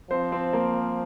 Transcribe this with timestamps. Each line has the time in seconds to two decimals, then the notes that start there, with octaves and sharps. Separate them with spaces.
0.10 F3 C4 C5
0.32 C4 C5
0.53 A#3 A#4